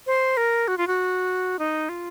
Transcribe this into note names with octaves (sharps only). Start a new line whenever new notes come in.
C5
A#4
F#4
F4
F#4
D#4
F4